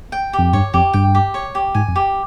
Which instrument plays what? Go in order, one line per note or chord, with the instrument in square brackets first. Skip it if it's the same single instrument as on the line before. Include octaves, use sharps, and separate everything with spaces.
[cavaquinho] G5
G4
[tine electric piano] F2
[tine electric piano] G2 [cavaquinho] C#5
[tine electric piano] F2 [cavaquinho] G4
[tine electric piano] G2 [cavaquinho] G5
[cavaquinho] G4
C#5
G4
[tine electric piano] G#2 [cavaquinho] G#5
[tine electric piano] F2
[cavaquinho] G4